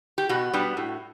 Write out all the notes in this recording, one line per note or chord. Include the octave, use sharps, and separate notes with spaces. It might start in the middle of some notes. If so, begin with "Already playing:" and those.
G4
B2 F#4
G3 B3 D4
A2